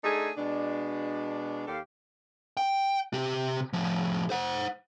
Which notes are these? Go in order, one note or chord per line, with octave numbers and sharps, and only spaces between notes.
A3 D4 D#4 G#4
B2 G#3 D4
D#2 G4 A4 F5
G5
C3 G4
A2 F3
C5 F#5